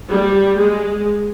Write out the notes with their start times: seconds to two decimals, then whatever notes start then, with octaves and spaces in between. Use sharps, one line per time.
0.10 G3
0.58 G#3